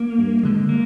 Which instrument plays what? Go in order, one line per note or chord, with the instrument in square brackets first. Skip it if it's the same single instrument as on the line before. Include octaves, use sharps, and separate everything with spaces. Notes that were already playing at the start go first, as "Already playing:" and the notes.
Already playing: [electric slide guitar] A#3
[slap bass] G2
D3 G#3
[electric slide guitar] A#3